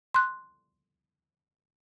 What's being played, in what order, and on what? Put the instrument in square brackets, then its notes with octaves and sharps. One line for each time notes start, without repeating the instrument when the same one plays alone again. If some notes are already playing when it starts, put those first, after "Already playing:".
[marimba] C6 F#6